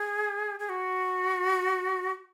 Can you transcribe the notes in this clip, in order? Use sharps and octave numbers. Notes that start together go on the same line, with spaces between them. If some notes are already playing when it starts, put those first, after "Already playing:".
Already playing: G#4
G#4
F#4